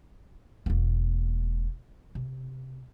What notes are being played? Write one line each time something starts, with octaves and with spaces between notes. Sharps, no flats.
E1 A#3
C3